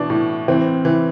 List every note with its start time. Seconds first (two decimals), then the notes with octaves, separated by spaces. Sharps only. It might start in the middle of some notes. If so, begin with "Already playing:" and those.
Already playing: B2 E3 D4
0.10 A2
0.48 E3 C4
0.85 E3